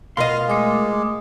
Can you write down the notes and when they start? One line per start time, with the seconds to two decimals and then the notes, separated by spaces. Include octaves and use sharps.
0.17 B2 F4 A#4 D#5 F5 C6
0.48 G#3 A3 D6 D#6